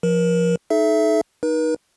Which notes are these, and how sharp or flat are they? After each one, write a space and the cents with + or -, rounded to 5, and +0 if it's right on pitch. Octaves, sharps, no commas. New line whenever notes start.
F3 +0 A#4 +30
D#4 +0 A4 -40 E5 +5
D#4 +0 B4 -45